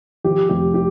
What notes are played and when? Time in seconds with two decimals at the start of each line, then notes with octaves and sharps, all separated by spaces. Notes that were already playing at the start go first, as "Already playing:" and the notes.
0.24 F3 G4
0.49 F1 G4
0.74 G4